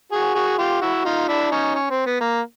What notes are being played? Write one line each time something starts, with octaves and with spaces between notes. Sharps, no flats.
F#4 G#4
F#4 G#4
F4 G4
E4 F#4
D#4 F4
D4 E4
C#4 D#4
C#4
C4
B3
A#3